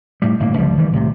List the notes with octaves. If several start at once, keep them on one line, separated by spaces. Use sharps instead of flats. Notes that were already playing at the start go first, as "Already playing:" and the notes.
A2 G3
G1 A2 A#3
C#2 D3 F3 G3
D#3 E3 G3
C2 A2 C3